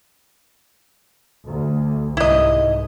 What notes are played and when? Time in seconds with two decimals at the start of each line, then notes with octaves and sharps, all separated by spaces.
1.46 D2
2.17 C2 G#2 E4 D#5